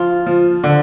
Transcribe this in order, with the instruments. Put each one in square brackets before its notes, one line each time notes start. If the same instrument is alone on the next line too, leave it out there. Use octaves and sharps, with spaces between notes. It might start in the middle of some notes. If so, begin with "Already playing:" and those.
Already playing: [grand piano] F3 [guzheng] F4
[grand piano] F3
D3